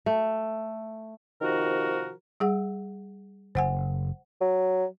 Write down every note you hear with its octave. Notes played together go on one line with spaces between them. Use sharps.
A3
C3 D#3 F3 F#4 A#4
G3 G#4 F#5
F#1 C5 F#5 G#5
F#3